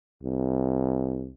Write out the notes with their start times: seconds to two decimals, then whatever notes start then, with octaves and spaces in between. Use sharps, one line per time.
0.23 C2